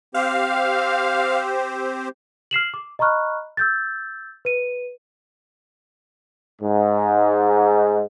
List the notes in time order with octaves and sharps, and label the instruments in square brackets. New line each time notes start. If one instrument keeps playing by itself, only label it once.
[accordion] C4 G4 C5 [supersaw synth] F5
[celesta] F6 C7 E7 F#7
D6
D#5 A#5 B5 C#6 F6 F#6
E6 G6 A6
B4 D#7
[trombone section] G#2